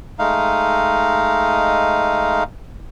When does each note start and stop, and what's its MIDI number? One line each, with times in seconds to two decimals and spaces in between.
0.19 2.43 56
0.19 2.43 57
0.19 2.43 63
0.19 2.43 77